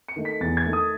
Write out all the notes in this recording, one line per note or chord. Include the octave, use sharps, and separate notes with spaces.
C#7
D#3 A3 D#4
B6
E2 A6
G#6
D#3 A3 D#4
D#6